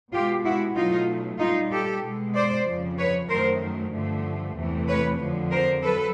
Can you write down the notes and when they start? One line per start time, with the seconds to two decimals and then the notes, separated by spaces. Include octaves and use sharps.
0.12 B2 G#3 F4 G4
0.44 E4 F#4
0.75 B2 F#3 A3 D#4 F4
1.39 A#2 G3 D#4 F4
1.71 G4 A4
2.03 B2 G#3
2.34 C5 D5
2.67 F2 C#3 F3
2.98 B4 C#5
3.29 F#2 D#3 F#3 A3 A#4 C5
3.93 G2 D3 F3 A3
4.57 E2 C3 E3 A3
4.88 B4 C#5
5.19 F2 D3 F3
5.52 A#4 C5
5.83 F#3 A4 B4